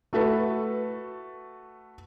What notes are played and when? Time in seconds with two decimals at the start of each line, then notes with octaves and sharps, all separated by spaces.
0.13 A3 F#4 A4 B4